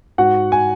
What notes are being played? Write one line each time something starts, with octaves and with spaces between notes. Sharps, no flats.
G#2 F#4 F#5
G#5